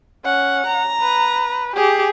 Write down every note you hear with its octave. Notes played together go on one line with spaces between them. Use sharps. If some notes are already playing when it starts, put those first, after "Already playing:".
C#4 F#5
A#5
B4
G4 G#4